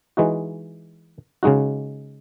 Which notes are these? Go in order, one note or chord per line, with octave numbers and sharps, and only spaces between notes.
E3 G#3 D#4 F#4
C#3 G#3 D#4 F#4